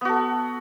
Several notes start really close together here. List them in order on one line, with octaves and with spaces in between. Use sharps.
B3 F#4 A4